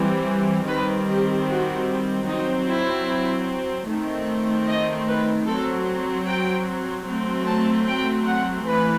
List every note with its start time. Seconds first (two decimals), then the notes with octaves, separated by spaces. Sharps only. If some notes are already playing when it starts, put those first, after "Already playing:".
Already playing: E3 G3 C4
0.67 D#3 G3 C4 B4
1.08 G4
1.48 F#4
2.28 F#3 C4 D#4
2.67 E4
3.87 D#3 A3 C4
4.68 D#5
5.08 B4
5.47 F#3 C4 A4
6.27 G5
7.07 F#3 A3 C4
7.47 A5
7.87 G5
8.27 F#5
8.67 E3 A3 B4